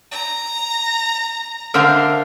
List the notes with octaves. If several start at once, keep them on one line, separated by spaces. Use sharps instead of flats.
A#5
D3 D4 A#4 C5 E5 F5